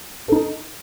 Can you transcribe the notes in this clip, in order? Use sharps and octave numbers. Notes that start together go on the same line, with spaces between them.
D#4 A4